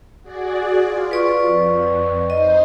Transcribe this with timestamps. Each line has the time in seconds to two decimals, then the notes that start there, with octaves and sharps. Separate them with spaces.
0.22 F#4 G#4 D5
0.82 F4
1.11 B4 D5 C#6
1.44 F2
2.30 D#4 C5 D#5